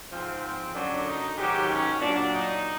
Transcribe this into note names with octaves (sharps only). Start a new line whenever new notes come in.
G#2 F3 C4
F#2 D3 F#3 D4
D#4
G#2 D#3 F#3 G4
C#4
A#2 F#3 D4
D#4